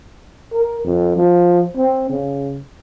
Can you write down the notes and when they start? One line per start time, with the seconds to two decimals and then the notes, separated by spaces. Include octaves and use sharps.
0.52 A#4
0.84 F2
1.16 F3
1.77 C4
2.10 C#3